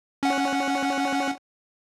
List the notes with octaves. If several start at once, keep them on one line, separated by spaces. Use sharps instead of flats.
C#4 F#5